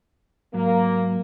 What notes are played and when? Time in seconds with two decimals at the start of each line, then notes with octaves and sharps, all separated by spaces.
0.54 G#2 F#3 A#3